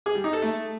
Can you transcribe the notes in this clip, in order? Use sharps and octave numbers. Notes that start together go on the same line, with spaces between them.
G#4
G3
D#4
A4
A3